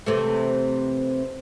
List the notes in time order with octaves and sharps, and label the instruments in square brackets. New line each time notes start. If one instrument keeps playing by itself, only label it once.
[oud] C3 E3 A3